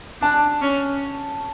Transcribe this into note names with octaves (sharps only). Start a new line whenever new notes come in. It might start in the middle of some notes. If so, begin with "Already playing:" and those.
D4 A5
C#4